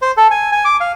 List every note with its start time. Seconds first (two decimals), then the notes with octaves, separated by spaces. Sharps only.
0.02 C5
0.17 A4
0.31 G#5
0.52 G#5
0.65 D6
0.80 F5